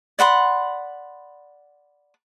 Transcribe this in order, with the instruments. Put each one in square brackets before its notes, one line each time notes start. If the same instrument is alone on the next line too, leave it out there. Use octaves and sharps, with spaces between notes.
[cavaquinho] D5 F#5 B5 C6